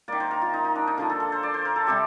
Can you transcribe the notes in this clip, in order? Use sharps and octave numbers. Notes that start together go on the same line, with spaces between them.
D#3 A#3 D5
C5
A#4
F4
D#4
D#4
D4
D#4
D3 F3 A#3 F4
A4
A4
C5
D5
C5
A#4
A4
C3 G3 C4 G4